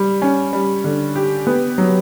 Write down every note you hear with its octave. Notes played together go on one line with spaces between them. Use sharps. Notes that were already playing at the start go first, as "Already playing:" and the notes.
Already playing: G3
C#4
G3
D3
G4
B3
F#3